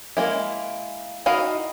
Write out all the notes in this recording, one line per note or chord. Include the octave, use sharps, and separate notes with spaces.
G#3 A#3 E4
D#4 E4 F#4 D#5 F5